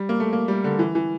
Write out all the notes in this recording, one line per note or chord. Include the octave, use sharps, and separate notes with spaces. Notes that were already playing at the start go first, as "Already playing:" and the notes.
Already playing: G3
A#3
A3
A#3
G3
D3
E3
E3